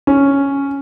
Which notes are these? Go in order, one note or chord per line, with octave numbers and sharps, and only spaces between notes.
C#4